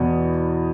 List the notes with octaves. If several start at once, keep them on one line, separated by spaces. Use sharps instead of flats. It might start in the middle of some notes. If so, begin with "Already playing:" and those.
Already playing: E2 B2 B3